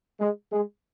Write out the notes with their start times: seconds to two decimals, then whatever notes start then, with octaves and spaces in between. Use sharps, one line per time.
0.20 G#3
0.52 G#3